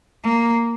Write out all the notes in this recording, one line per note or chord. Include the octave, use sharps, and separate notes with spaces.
A#3